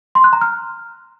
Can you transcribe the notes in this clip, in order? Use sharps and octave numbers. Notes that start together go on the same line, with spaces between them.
C6
F#6
A#5
F6